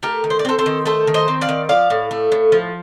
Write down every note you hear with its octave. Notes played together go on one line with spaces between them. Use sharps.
A3 G4 A#4
D#3
C5
D5
C4 A4 C5
A4 C5
D#3
A3 A4 C5
D#3
C5 D#5
C4
D5 F5
D#3
F3 D5 F5
A2
A3
A2
F3